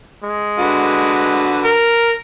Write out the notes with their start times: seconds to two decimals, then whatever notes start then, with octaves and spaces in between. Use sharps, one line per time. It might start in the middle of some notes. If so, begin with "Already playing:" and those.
0.24 G#3
0.59 D3 F#4 B4
1.64 A#4